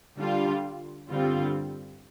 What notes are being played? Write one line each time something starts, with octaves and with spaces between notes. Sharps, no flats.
D3 G3 D4 F4
G2 D3 G3 C4 F4